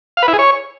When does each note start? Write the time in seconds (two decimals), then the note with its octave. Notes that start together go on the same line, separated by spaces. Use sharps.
0.17 F5
0.23 B4
0.28 E4
0.33 G#4
0.39 C#5